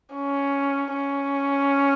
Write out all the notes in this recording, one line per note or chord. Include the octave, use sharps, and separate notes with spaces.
C#4
C#4